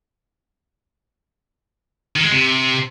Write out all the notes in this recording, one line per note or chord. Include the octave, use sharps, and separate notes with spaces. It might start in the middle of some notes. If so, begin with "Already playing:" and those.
D#3
G#3
C3